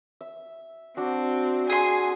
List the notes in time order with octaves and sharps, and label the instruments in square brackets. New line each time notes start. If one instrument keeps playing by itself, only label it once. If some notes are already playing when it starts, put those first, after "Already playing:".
[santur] E5
[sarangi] C4 [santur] D4 F#4
[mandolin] G#4 C6 [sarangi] G#5